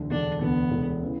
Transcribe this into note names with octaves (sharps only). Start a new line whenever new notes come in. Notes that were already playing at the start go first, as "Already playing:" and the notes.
Already playing: E1 D2 D3
E1 D2 D3 D4
E1 D2 D3 B3
E1 D2 D3
C#3 E3